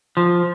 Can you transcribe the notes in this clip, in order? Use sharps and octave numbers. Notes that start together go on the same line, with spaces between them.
F3